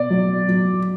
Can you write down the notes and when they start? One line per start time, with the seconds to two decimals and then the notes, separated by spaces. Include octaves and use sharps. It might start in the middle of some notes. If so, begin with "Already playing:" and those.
Already playing: B2 D5
0.10 F#3
0.48 F#3